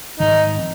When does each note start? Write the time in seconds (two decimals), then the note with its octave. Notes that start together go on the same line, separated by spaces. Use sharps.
0.20 G#2 D#3 G3 D#4
0.58 F3 C4